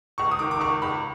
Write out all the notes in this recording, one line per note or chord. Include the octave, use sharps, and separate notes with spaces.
C#2 C#6
D#6
D#3 D6
D6
C#2 C#6
C#2 B5